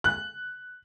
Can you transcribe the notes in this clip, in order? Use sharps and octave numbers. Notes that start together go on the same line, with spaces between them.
F#6